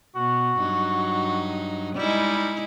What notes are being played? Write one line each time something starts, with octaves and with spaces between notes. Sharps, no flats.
B2 B3 F#4
G2 F#3 D#4
G3 G#3 D#4 E4